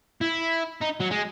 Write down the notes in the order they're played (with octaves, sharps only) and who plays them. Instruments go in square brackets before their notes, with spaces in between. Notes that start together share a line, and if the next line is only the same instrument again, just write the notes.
[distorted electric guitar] E4
D#4
F#3
G#3